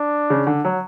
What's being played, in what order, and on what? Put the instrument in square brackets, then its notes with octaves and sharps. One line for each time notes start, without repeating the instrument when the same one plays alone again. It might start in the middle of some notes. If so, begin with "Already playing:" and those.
Already playing: [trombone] D4
[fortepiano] C#3
D3
F#3